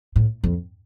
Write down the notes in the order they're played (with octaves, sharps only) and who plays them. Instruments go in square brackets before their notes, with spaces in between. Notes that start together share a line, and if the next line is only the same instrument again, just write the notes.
[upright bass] A2
F2